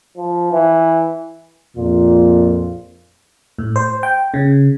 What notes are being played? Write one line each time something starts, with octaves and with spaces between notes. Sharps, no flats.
F3
E3
A#1 F2 A#2 F4
A2
C5
G5
C#3